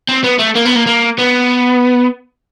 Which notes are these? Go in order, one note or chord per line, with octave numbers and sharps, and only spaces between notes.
C4
B3
A3
A#3
B3
A#3
A#3
B3